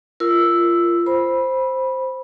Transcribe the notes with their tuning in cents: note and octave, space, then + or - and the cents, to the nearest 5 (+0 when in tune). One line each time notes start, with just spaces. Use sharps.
F4 -20 A#4 +0 E6 +0
C5 +0 B5 -15